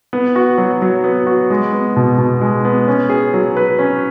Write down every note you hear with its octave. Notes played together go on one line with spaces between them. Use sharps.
B3
F#4
F#3
F#3
B3
F#4
G#3
B3
B2
B2
G#3
B3
C#4
G#4
F#3
B4
C#4